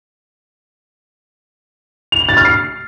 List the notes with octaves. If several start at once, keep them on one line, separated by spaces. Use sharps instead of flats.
F7
F#7
A6
F6
C7